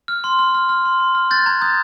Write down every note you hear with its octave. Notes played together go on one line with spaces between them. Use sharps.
F6
C6
F6
F6
F6
C6
C6
F6
F#6 G6 A6
A#5 G#6
D#6 G6 A6